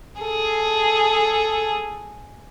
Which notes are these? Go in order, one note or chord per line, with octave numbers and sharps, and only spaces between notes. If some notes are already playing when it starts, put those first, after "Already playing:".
G#4 A4